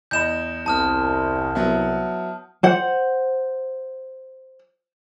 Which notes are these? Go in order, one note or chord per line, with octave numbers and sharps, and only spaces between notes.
E2 D#5 B5 G6 E7
C2 A5 D#6 F6
F#3 B3 E4
C5 F#5